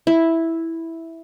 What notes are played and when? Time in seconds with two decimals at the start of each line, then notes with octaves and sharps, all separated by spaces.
0.07 E4